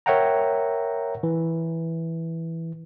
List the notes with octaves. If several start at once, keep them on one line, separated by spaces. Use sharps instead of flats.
A#4 C#5 E5 F#5 G5 A#5
E3